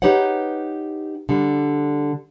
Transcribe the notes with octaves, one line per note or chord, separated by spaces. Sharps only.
D#4 G4 B4 C#5 F#5
D3 G3